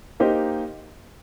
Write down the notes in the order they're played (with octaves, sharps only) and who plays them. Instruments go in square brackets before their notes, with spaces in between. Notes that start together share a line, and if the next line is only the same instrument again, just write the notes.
[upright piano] A#3 D#4 G4 C5